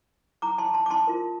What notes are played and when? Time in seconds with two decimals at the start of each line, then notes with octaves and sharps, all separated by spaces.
0.42 A#5 D6
0.58 A5 C6
0.74 A5 C6
0.86 D6
0.90 A5 C6
1.07 F4 A#4